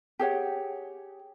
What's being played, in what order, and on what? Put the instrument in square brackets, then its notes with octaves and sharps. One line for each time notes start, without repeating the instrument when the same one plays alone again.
[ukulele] G4 G#4 C#5 F#5